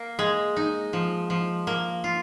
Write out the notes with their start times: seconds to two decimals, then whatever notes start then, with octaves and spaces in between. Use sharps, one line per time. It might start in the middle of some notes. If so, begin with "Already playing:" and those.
Already playing: A#3
0.19 G#3
0.57 D#4
0.93 F3
1.30 F3
1.67 A#3
2.04 F4